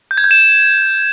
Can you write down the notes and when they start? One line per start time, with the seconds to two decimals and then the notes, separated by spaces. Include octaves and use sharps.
0.11 G6
0.18 G#6
0.24 G6
0.31 E7